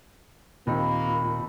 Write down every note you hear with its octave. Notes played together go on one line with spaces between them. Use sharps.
D#2 A#2 A#3 C4 D#4 B5